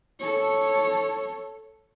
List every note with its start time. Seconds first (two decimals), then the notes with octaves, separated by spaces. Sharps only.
0.20 A4 C#5